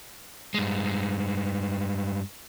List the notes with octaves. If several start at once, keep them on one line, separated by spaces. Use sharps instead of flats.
G2 G#3